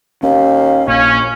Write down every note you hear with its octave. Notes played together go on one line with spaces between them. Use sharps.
D#2 C#4 F5
A#1 A#2 C#4